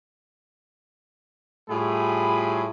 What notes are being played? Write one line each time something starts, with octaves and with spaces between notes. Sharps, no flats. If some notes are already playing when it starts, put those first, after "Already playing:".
A2 G3 A3 F4 G#4 B5